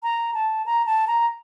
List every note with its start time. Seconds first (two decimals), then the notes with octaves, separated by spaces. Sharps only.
0.03 A#5
0.34 A5
0.66 A#5
0.86 A5
1.07 A#5